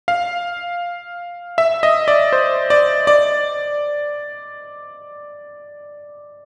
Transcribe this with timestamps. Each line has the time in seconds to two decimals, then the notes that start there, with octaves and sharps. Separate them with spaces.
0.08 F5
1.58 E5
1.83 D#5
2.08 D5
2.33 C5
2.70 D5
3.07 D5